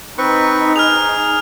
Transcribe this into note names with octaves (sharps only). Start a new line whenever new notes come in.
C4 D#4 B4 C#6
G#4 F6 F7